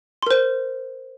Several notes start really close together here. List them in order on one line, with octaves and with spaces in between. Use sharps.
C6 A#4 C5